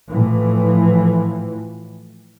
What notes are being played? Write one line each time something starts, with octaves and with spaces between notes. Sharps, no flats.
A2 E3 F3